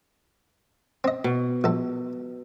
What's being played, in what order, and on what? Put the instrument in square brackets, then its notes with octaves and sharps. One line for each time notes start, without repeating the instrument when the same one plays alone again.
[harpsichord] C4 D#5
[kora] B2
[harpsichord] A#1 A4